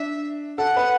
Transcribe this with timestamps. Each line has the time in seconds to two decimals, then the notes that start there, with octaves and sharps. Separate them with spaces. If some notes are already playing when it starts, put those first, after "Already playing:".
Already playing: D4 E5
0.58 A4 F#5
0.76 B4